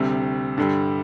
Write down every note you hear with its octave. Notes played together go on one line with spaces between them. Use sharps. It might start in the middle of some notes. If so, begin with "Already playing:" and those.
Already playing: D2 C3 G3
G2 D3 G3